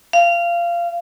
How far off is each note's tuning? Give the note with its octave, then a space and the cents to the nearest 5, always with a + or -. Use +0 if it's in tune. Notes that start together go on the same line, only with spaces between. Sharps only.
F5 -20